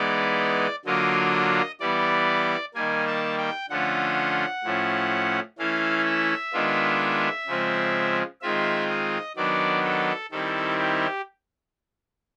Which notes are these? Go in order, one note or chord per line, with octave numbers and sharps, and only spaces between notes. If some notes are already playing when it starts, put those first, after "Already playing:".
Already playing: E3 G#3 B3 D#4 D5
D3 F#3 A#3 D4 F4 D#5
E3 G3 B3 D5
D#3 G3 A#3 G#5
A5
G5
D3 F3 A3 C#4 F4 F#5
A2 F3 A3 C#4
E3 A3 C#4 E4 F5
E5
D#3 G#3 B3 D4 F4
C#3 F3 G#3 C4
D#3 G#3 C4 F4 E5
D#5
D#3 F#3 B3 D4 D5
A4
D#3 G3 C4 E4 A4
G4